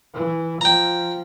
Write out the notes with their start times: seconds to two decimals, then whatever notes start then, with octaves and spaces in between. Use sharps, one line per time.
0.14 E3
0.61 F3 G5 A#5